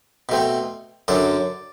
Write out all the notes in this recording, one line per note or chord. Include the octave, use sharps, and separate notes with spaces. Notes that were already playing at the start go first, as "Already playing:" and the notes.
B2 A3 C4
F#2 D3 F#3 D5